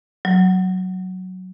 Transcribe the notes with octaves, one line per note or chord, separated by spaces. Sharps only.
F#3